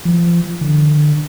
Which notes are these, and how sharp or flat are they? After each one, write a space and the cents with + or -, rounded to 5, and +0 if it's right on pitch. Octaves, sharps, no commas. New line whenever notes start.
F3 -30
D3 +25